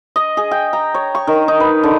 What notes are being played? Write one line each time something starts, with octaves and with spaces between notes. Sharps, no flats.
D#5
G#4
G5
A#5
C#5
C#6
D#3
D#4
B4
D3